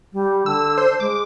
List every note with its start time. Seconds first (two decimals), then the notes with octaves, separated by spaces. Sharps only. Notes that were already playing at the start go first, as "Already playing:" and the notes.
0.13 G3
0.46 D3 E6
0.78 C5
1.00 G#3 D6